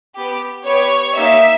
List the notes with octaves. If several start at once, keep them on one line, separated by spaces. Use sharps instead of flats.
B3 G4
B3 G4 C#5
A#3 D#4 G4 E5